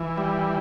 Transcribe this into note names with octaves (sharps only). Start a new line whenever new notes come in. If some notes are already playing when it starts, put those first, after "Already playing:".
Already playing: E3
G3